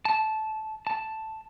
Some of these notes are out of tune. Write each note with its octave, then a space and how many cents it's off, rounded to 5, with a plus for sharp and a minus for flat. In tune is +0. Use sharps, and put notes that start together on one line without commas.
A5 -15
A5 +0